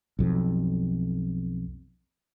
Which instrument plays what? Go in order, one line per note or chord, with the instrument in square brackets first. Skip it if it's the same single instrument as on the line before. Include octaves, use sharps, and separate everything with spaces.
[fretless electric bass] B1 F2